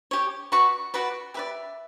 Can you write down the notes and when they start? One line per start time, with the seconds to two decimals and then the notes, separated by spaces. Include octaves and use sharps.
0.11 G4 C#5
0.52 F#4 B4 D5 C#6
0.94 F#4 B4 D5
1.34 G4 B4 D5 E5